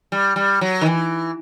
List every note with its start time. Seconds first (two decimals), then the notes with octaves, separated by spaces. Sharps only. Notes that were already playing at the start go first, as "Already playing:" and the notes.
0.12 G3
0.36 G3
0.61 F#3
0.81 D#3
0.86 E3